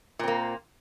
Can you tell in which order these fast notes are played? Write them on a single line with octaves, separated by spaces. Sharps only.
A#2 C4 A#3